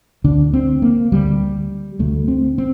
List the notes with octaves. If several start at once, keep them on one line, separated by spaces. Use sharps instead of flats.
D2 D3 D4
C4
A#3
D2 D3 G3
D2 D3 A3
C4
C4